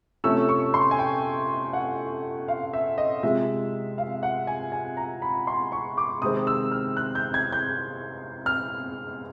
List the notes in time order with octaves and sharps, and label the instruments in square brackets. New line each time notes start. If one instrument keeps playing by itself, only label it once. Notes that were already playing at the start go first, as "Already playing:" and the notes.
[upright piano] C3 F3 A3 C#4 E6
C#6
C6
G#5
G5
F#5
F5
E5
D#5
C3 F3 G#3 E5
F5
F#5
G#5
G#5
A#5
B5
C6
C#6
D6
C3 D#3 G#3 C4 D#6
E6
F6
F#6
G6
G#6
G6
F6